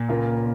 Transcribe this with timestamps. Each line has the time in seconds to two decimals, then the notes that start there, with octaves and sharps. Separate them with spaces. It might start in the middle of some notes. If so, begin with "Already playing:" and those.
Already playing: A#2
0.08 C#2 C#3 A#3 F4 A#4